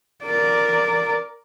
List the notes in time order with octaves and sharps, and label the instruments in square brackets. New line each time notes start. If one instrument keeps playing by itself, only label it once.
[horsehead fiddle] A#4 D5